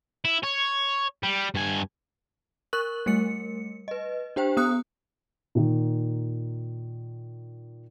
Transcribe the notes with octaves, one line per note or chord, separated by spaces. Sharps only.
E4
C#5
G3
G2 G#5
A#4 C#6 F#6 F#7
G3 A3 A#4 C#7
B4 D#5
D4 G4 C5 G5
B3 D#6 F#6
A#2 D#3